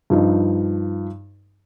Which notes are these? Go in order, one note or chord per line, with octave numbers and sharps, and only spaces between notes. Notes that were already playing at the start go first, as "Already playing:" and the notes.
G2 F3 D#4